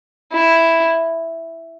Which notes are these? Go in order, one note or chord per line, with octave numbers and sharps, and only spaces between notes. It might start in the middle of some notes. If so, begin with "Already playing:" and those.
E4